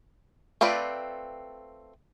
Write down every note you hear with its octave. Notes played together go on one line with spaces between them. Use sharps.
A3 C4 F4 B4 D5